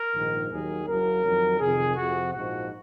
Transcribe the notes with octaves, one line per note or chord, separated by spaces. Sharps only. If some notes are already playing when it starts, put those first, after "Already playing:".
Already playing: A#4
A#1 G#2 D#3
D#2 D#3 F#3 G#4
F#1 F#2 C#3 F#3 A#4
F2 D#3 F#3
F2 C3 D#3 G#4
F2 C3 F3 F#4
A#1 G#2 F3 F#4